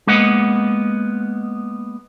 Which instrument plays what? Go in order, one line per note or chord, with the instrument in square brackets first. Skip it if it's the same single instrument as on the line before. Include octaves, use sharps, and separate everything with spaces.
[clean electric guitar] G#3 A#3 B3 D#5 F#5